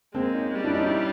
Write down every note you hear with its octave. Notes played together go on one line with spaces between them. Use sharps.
G#3 A#3 C4
C#4 D#4
G3
D4 E4
C#4 D#4
D4 E4